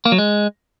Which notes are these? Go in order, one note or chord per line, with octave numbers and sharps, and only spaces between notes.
A#3
F#3
G#3